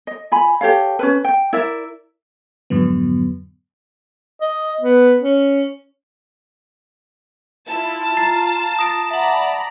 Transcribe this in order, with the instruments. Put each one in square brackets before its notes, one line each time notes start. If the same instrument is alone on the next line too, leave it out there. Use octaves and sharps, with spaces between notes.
[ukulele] D#5
F4 G#5 B5
G4 A4 C#5 F5
C#4 A#4 B4
G5
E4 A#4 D5 E5
[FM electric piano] F2 G#2 D3 F#3 B3
[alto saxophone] D#5
B3
C#4
[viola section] E4 F4 [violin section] A5
[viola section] F4 [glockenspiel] A#5 A6 C7
[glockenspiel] D#6 A#6 D7
[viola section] D5 A#5 B5 [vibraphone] E5 F#5